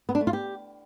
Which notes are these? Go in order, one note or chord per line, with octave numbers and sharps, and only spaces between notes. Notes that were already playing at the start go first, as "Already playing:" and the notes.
B3
D4
A3
F4
G4